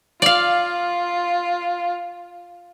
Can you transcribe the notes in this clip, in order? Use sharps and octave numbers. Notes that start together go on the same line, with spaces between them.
F4 D5 F5